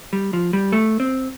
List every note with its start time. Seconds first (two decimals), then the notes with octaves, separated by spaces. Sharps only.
0.13 G3
0.33 F3
0.53 G3
0.72 A3
1.00 C4